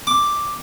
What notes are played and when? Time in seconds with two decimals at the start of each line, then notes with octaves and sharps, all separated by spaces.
0.07 D6